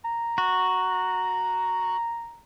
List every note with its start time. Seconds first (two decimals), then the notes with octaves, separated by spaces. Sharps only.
0.05 A#5
0.38 F#4